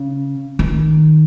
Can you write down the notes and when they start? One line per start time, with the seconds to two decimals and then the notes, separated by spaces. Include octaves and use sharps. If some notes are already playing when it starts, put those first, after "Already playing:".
Already playing: C#3
0.59 D#3